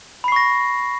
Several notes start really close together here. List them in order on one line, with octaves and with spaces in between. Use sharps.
B5 C7 C#6 A#6